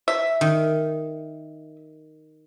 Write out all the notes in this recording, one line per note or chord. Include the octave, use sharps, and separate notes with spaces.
E5
D#3